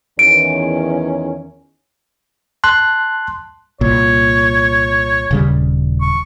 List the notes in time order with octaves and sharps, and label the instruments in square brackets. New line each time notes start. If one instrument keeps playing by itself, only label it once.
[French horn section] E2 D#3 C#4 [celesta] D7
[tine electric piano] A5 C6 F#6
[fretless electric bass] C2 A#2 [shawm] C#5
[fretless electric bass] D#1 C#3 G3
[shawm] C#6